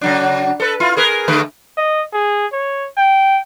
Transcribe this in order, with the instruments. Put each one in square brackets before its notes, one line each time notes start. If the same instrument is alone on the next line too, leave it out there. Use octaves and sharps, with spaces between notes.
[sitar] C#3 F#3 D4
A4 B4
E4 F4
G#4 A#4 B4
D3 A3 B4
[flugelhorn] D#5
G#4
C#5
G5